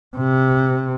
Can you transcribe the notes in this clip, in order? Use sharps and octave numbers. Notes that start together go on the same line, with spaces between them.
C3